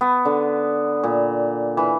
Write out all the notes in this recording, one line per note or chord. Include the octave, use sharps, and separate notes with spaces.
B3
D3
A#2
E3